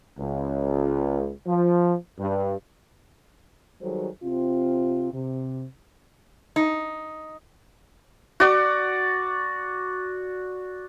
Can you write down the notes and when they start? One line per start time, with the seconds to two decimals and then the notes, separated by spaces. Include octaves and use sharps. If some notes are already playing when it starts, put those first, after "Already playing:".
0.18 C#2
1.46 F3
2.18 G2
3.81 D#3 F#3 G3 G#4 A4 C5
4.23 C3 C4 F4
5.12 C3
6.56 D#4
8.40 F#4 D5